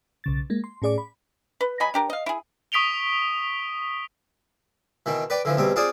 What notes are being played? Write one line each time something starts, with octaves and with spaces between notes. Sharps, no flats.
B1 C#3 A6
G#3 A#3
C6
A2 C#4 G#4 D5 D6
B5
B4
F#3 D#5 G#5 B5
D4 G4 A#4
D#5 F5
E4 G#4
C#6 D#6 B6 D7 F7 G7
B2 D#3 E3
B4 D5 G5
D3 E3 F3
E2 B2 G3 C4
C4 F4 G#4 C5 D5